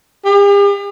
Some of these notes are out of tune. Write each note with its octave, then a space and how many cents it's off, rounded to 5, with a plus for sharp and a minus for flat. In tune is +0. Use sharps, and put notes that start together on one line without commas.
G4 +45